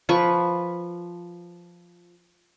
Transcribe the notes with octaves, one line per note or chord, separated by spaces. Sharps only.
F3 B4 C#6